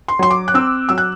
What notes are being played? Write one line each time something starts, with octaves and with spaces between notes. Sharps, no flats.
C6
F#3 C6
D6
F#6
C4 E6
F#3 E6
F#6